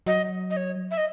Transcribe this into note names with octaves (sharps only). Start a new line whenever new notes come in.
F#3 D#5
D#5
C#5
E5
D#5